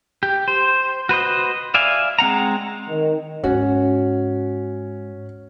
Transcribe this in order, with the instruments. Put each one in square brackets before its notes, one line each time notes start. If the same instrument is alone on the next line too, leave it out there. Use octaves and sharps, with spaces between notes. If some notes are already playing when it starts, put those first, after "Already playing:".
[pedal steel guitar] G4
C5
F#4 B4 C5 D#5
D5 E5 F5 G#5
G#3 C4 F#5 A#5
[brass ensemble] D#3
[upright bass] G#2 [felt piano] C#4 [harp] F#4